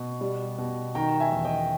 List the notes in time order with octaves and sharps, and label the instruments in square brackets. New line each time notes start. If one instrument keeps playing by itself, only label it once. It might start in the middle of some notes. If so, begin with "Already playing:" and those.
Already playing: [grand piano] B2
G3
B2
D#3 G5 A#5
E5 G#5
E2
D#5 G5